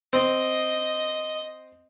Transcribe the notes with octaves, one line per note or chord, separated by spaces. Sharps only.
C4 D#5